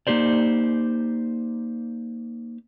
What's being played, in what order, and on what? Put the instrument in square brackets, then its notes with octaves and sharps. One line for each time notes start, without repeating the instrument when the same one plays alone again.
[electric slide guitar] A#3 D#4 G4 C5 D5